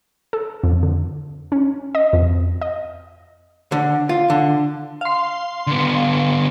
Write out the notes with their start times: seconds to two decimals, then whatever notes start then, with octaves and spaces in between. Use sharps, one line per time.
0.33 A4
0.64 F2
0.83 D3
1.52 C#4
1.95 D#5
2.13 F2
2.62 D#5
3.72 D3
4.09 F4
4.30 D3
5.01 F5 C6
5.67 D3 B3